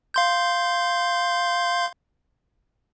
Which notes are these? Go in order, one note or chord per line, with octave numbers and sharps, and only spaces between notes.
F5 C6 G6